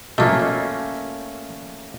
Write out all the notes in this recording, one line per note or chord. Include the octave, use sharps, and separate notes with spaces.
B2 F3 A3 A#3 C#4